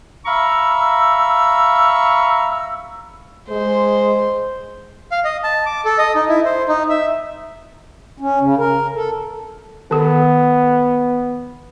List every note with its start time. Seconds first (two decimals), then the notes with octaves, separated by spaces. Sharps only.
0.26 E5 F5 A#5 B5 C#6 E6
3.50 G#3 C5
5.12 F5
5.25 D#5
5.44 A5
5.66 D6
5.85 A4
5.98 D#5
6.15 D#4
6.29 E4
6.45 C5
6.68 D#4
6.90 E5
8.20 C#4
8.41 C#3
8.58 A#4
8.95 A4
9.91 D#3 B3 A4